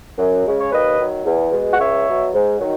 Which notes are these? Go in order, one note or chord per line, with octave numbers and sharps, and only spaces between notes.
F#2
C#3 G#3
C#5
D#2 B4 D#5
D#3 F#3
E2
B2 G#3
F#5
C#2 C#5 E5
B2 F#3
G#2
D#3 F#3